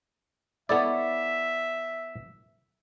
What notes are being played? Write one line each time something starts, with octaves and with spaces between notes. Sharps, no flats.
B3 E4 A4 C#5 D5 E5